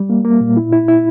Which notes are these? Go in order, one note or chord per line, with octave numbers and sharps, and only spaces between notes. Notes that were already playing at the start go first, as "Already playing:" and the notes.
Already playing: G3
A#3
A#3
A#2
E4
E4
E4